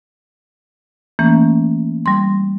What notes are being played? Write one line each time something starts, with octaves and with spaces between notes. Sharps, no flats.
E3 A3 A#3 C#4
G3 C6